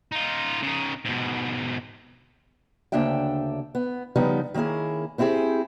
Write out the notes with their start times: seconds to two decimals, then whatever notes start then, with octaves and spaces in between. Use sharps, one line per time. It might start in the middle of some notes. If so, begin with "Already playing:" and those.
0.12 D#4 F4
0.62 C#3 D#4
1.05 G#2 B2
2.92 D2 C#3 A#3 D4 E5 G5
3.75 B3
4.16 C#3 F3 G3 B3 D#4
4.54 D#3 A#3 C#4 E4 G#4
5.18 B3 C4 E4 G4 G#4